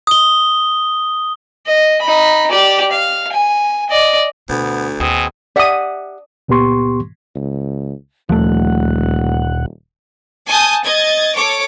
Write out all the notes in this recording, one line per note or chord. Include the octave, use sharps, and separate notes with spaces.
D#6 G7
D#5
D#4 B5
G4 D5
F5
G#5
D5 D#5
D2 B2 B3
D#2 B2 C4 G#4 G#5
G4 D5 E5 F#5 D#6
C#2 A#2 B3 G4 C6 C#6
C#2
D#1 D2 A#2 F3 A3 F#5
G#5 A5 D#6 G6
D#5 G#6 A6
A4 C#5 D6